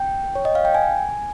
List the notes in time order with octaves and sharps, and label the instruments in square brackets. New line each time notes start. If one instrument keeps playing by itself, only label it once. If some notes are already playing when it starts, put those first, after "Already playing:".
Already playing: [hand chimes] G5
C#5
D#5
F5
G5
G#5